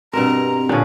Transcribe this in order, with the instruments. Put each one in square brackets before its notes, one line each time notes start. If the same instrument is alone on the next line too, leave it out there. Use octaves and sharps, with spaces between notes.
[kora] G2 B2 A#4 [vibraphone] C4 [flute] A#5
[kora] A#2 G#4 [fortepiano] D3 C#4